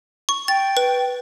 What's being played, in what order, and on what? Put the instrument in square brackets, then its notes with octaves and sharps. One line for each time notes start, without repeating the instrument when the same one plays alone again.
[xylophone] C#6
[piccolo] G5 [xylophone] A6
[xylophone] B4